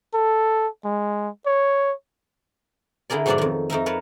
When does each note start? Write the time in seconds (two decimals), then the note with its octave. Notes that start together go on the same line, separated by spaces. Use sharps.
0.14 A4
0.85 G#3
1.46 C#5
3.10 D3 E4 G#4 A#4 D5
3.26 G#2 B2 F#3 D4 A4 D5
3.38 F2 D#3
3.70 F2 D#4 A#4 E5
3.86 A#4 B4 C#5 A5